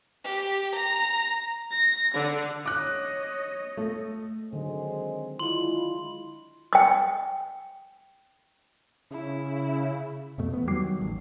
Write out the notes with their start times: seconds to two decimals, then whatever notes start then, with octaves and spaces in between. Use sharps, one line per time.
0.22 G4
0.73 A#5
1.70 A#6
2.14 D3
2.66 C#5 D#5 D6 F#6
3.77 A3
4.53 D3 D#3 F#3 G#3 C4 G#4
5.39 G#3 D4 E4 F4 C6 F#7
6.73 G5 D#6
9.11 C#3 E4
10.38 F2 B2 A3
10.53 E2 B3
10.68 D#3 F#3 G3 D6 C7
11.01 A1